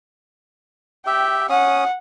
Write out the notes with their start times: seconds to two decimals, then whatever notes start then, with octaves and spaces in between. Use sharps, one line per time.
1.07 G4 E5 G5
1.50 C#4 F#5 D#6